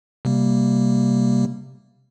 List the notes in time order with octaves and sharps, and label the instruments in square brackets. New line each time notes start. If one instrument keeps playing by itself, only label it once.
[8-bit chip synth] C3 G3 A#3